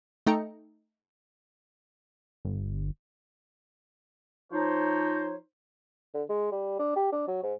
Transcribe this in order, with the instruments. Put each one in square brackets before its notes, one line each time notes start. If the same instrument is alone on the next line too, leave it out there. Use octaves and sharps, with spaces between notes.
[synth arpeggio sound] A3 D#4 A4 G5 A#5 C#7
[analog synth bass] G1
[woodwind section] F3 D#4 C5 C#5
[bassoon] D3
G#3
G3
D4
G4
D4
F#3
G#2